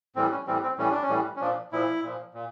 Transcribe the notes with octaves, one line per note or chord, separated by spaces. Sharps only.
A2 E3 G3 C4
C#4
A2 E3 G3 C4
C4
A2 E3 G3 C#4
D4
C#4
A2 E3 G3
C#4
A#2 F3 D4
A#2 F3 E4
A#2 F3
A#2